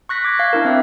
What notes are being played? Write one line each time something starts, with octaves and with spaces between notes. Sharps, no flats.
C#6 F#6 A#6 B6
D6 G#6
F5
D4 E4 A#4
C4 E5